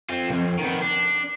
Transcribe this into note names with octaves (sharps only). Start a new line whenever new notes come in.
C4 F4
B1 F2
D#3 B3
D4